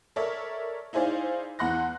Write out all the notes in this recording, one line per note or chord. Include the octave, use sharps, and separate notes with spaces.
A4 A#4 C#5 D5 E5
D#4 E4 G#4 C5 D5 F5
E2 F#5 C6 F#6 A#6